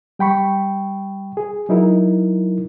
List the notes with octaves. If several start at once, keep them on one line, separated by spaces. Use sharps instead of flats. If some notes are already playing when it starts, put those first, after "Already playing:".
G3 G5 B5 C#6
G#4
F#3 D#4 E4 A#4